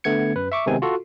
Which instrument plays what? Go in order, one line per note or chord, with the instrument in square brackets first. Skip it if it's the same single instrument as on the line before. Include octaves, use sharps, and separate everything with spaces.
[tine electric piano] D3 A3 B3 G#6 C#7
F#2 B4
E5 C#6 D6
C3 D#3 G#3 B3 C4 G#5
F4 F#4 A4